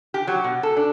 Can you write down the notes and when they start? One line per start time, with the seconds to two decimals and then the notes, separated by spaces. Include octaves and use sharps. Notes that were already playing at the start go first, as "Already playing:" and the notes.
0.14 G4
0.27 F#3
0.44 B2
0.63 A4
0.77 D4